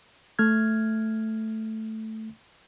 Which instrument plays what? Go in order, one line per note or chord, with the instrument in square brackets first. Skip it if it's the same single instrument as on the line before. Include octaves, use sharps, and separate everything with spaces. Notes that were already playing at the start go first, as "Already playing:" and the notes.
[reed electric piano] A3 F6 G#6